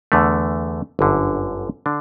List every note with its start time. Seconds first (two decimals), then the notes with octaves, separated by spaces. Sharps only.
0.12 E2 D3 A3
0.99 G1 F#2 D3
1.86 D3 D4